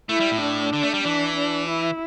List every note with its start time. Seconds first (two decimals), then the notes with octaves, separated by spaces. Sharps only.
0.09 A3 E4
0.20 G3
0.31 A2
0.41 D4
0.73 D3
0.83 A3
0.94 G3
1.04 E3 D4
1.37 D4
1.68 E4